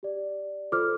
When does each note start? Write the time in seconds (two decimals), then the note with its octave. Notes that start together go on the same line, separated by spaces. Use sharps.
0.03 G4 D5
0.72 F4 A4 C5 D6 F6